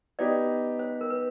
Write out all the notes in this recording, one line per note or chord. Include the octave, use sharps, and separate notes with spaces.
B3 D#4 G4 D5
C5
A#4
B4